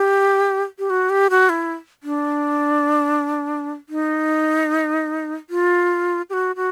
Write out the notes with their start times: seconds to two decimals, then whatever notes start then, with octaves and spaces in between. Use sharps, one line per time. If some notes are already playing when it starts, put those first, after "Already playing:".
Already playing: G4
0.79 G4
0.90 F#4
1.10 G4
1.30 F#4
1.49 E4
2.03 D4
3.89 D#4
5.50 F4
6.30 G4
6.33 F#4
6.56 F#4